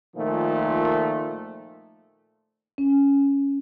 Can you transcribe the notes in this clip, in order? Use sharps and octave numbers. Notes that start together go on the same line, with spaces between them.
A#2 D#3 F3 A3
C#4